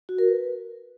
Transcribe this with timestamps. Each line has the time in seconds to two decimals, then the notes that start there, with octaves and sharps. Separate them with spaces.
0.09 F#4
0.19 A#4
0.28 B4